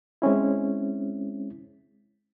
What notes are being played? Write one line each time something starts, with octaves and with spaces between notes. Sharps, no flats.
G#3 C4 C#4 E4